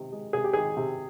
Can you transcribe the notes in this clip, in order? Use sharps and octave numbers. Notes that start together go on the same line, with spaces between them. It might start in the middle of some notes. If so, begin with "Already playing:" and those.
Already playing: C3 D#3
G#3
C3 G#4
G4
D#3 G#4
C3